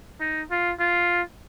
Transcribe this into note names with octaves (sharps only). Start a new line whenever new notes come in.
D#4
F4
F4